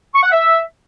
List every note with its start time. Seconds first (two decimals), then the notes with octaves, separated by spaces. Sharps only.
0.15 C#6
0.23 F#5
0.32 E5